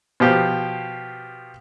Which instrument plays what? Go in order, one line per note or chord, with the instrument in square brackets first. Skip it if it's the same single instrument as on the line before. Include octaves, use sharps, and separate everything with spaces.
[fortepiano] B2 F3 G4